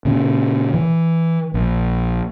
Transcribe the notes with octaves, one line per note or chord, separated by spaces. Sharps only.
A#2 C#3
E3
A#1